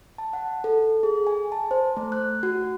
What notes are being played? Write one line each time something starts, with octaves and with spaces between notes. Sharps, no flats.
A5
F#5
A4
G#4
G#5
A5
C5
A3
F#6
F#4